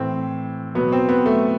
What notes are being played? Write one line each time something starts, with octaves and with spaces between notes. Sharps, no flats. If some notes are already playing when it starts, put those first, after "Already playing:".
Already playing: A2 E3 C4
B2 F#3 B3
C4
B3
A3